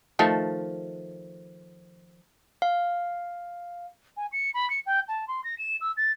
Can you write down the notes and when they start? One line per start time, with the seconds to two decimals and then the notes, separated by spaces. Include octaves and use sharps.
0.19 D#3 F3 A3
2.62 F5
4.17 G#5
4.32 C#7
4.54 B5
4.70 C#7
4.86 G5
5.08 A5
5.28 C6
5.44 A#6
5.58 E7
5.81 E6
5.97 A6